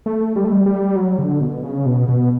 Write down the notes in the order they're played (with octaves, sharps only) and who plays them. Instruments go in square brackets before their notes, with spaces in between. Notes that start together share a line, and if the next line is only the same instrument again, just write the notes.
[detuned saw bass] A3
G3
A3
G3
G3
F#3
D3
B2
C#3
B2
B2